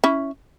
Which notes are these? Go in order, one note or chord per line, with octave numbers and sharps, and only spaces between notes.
C#4 E4